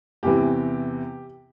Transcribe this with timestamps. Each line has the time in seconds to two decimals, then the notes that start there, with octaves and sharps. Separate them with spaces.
0.23 E2 C3 E3 G4